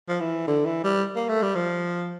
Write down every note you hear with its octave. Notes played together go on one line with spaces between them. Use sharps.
F3
E3
D3
E3
G3
A#3
A3
G3
F3